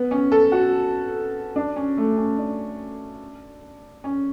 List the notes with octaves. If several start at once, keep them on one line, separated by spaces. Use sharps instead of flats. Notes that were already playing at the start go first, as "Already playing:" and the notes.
Already playing: B3
C#4
A4
F#4
D4
C#4
A3
C#4
D4
C#4